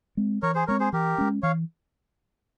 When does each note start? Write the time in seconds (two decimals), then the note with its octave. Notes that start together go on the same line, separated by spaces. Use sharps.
0.17 G#3 C4
0.42 E3 A#4 C#5
0.55 G#4 C5
0.67 G#3 C4 A#4 C#5
0.80 G#4 C5
0.93 E3 G4 A#4
1.18 G#3 C#4
1.43 E3 C#5 F5